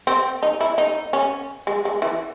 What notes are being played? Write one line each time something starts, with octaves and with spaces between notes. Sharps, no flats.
C4
D#4
E4
D#4
C#4
G#3
G#3
E3